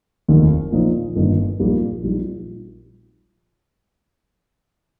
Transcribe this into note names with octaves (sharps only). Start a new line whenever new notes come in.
F1 D#2 D#3
A#1 A#2 F3 D#4
G1 G2 D#3 A#3 D#4
A#1 A#2 G3 A#3 D#4
A#1 A#2 G3 D#4